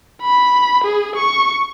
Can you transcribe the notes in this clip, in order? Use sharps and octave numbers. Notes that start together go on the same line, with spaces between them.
B5
G#4
C#6